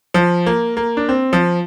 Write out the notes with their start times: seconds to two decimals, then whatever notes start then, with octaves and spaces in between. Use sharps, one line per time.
0.14 F3
0.46 A#3
0.77 A#3
0.97 D4
1.09 C4
1.33 F3